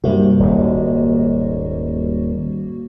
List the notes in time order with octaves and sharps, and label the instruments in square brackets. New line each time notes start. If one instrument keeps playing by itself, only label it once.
[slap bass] G2 C3 [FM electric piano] G3 A#3 F#4
[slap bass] D#1 D#2 G#2